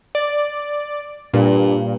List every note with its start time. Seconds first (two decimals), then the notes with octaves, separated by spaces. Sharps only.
0.15 D5
1.34 G2 A#2